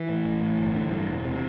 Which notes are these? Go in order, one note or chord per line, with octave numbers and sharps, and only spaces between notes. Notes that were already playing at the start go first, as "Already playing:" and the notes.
Already playing: E3
A2
A1
A2
G1
D3
G2
E1
C3